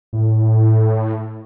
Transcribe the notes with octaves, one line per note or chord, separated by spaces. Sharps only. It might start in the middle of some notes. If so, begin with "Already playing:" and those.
A2